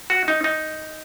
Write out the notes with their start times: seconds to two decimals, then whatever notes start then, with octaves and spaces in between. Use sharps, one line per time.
0.10 F#4
0.28 D#4
0.44 D#4